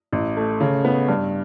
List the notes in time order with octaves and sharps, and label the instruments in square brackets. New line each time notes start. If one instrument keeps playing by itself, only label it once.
[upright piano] A1
A3
C#3
B3
G2